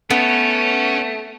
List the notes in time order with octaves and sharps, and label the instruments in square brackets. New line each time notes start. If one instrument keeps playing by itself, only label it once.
[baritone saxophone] A3 [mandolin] B3 [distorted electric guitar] C#4